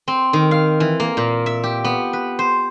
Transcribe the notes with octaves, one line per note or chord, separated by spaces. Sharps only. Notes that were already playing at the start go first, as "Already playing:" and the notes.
C4
D#3
F5
E3
A#3
A#2
E5
G4
B3
B4
C5